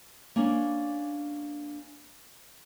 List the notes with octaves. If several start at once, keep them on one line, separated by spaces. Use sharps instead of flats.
A#3 C#4 D4